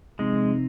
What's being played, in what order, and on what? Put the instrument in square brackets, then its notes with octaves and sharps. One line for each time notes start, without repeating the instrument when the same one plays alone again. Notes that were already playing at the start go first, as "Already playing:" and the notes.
[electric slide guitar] C3 F3 C4 D#4 [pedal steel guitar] G#3